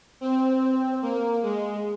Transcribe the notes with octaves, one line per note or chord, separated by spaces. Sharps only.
C4
A#3
G#3